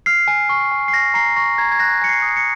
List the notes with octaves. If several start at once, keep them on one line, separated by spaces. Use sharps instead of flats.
F6 C7
G#5
C#6
G#5
C7
F6 A#6
A#5 C7
C#6 A#6
A#5 G#6
G#6
F#6 A#6
G#5 C#7
C7
D#6
C#7